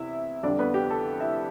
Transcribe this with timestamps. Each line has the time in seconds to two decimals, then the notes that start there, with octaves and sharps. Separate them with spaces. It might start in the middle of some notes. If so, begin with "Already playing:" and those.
Already playing: E2 C3 E4 E5
0.43 F2 D3 G3 D4 D5
0.59 B3 B4
0.74 G4
0.90 A4
1.20 E4 E5